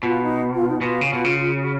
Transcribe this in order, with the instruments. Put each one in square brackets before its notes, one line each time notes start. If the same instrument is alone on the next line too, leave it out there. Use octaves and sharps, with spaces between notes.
[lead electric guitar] B2 [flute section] F4
[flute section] D#4
F4
D#4
[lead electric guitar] B2 [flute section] F4
[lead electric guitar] C#3
B2
C#3
[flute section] F#4